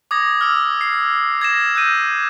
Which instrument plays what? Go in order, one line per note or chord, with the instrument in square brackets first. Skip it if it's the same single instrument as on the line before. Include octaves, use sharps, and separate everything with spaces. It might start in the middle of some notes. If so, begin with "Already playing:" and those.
[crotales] D6 D#6 G#6 A#6
D6 E6 F6
C7
G#6 A#6 E7
E6 F#6 G6 A#6 D#7